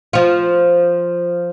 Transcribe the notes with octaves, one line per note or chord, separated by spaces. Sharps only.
F3 F4